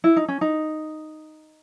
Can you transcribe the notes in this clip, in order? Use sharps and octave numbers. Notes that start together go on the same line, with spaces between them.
E4
D#4
C#4
D#4